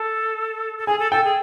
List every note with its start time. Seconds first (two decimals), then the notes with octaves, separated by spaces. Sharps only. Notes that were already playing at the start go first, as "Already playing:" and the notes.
Already playing: A4 A5
0.78 A4
0.87 G#4 G#5
0.99 A4
1.12 A4 G5
1.24 G#4